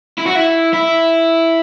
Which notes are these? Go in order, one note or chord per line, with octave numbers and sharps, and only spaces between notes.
E4
F#4
E4
E4